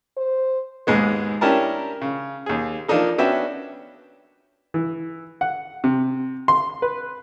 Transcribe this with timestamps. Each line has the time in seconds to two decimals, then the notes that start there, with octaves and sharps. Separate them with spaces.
0.17 C5
0.87 D#2 G#2 G#3 B3
1.41 C#4 D4 E4 G4 A#4 A5
2.01 C#3
2.46 D#2 G#4
2.88 F3 A#3 D4 D#4 A4
3.18 B3 C#4 D4 F#4 E5 G5
4.74 E3
5.41 F#5
5.84 C3
6.48 C6
6.82 B4